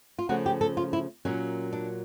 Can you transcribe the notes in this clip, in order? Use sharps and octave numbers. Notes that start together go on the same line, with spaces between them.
F4
C#3 F3 A3 C#4 F#4
G4
A4
F4
E4
A#2 F#3 A#3 C#4
D4